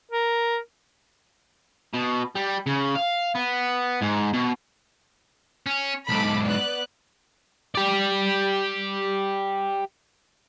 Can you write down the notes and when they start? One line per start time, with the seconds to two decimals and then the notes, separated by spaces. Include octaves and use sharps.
0.12 A#4
1.94 B2
2.36 G3
2.67 C#3
2.95 F5
3.35 B3
4.02 G#2
4.33 B2
5.66 C#4
6.09 B1 G#2 A4 B5 D6
6.45 B3 D5 F#6
7.75 G4 D5